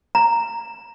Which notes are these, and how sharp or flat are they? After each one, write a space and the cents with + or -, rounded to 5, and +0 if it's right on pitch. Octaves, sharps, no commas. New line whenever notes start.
A#5 -5